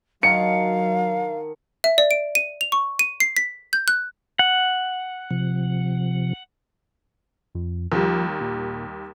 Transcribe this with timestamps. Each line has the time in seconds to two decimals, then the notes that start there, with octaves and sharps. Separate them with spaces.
0.23 D#3 F#3 F5 F#5 A5 C#7
1.84 E5
1.98 D5
2.11 D7
2.35 D#7
2.61 F7
2.72 C#6
2.99 D#7
3.20 C7
3.37 B6
3.73 G6
3.88 F#6
4.39 F#5
5.31 C3 F3
7.55 F2
7.92 D#2 F3 G3
8.41 A#2